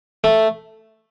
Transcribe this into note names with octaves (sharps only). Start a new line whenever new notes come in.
A3